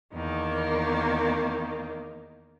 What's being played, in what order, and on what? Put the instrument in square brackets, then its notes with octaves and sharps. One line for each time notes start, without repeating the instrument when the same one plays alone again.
[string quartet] E2 D#3 A#3